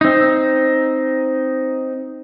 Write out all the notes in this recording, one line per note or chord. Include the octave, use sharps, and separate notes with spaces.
C4 D#4